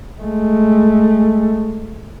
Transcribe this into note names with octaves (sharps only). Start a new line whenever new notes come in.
G#3 A3